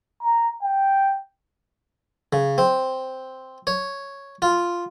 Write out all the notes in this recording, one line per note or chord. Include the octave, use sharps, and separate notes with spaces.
A#5
G5
C#3
C4
C#5
F4